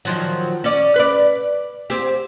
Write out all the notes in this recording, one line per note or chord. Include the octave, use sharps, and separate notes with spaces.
D#3 F3 F#3
C#4 D5
B4 D5
C4 G4